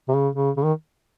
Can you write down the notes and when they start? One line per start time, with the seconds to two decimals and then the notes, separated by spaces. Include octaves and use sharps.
0.09 C3
0.14 C#3
0.36 C#3
0.57 C#3
0.64 D#3